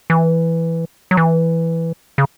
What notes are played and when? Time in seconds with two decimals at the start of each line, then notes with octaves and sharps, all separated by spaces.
0.10 E3
1.11 F#3
1.17 E3
2.18 C#3